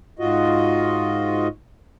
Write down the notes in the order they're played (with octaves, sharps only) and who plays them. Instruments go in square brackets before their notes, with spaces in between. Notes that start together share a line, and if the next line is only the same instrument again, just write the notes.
[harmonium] G#2 F4 F#4 D#5